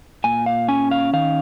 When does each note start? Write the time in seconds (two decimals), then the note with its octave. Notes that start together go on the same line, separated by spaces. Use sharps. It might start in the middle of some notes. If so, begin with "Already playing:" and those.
0.24 A#2 G#5
0.46 F5
0.68 C#4 G#5
0.91 F5
1.13 D#3 F5